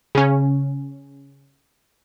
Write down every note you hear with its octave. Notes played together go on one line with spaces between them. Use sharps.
C#3 C#4